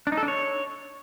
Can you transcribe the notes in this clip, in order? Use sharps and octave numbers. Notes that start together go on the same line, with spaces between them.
D4
D#4
A4
D4
C#5